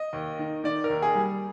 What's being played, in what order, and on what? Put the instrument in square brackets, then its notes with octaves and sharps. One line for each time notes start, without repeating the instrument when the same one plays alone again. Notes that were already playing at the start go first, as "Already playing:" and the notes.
Already playing: [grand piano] D#5
D#2
D#3
D#3 D5
A#4
D#2
G#4
G3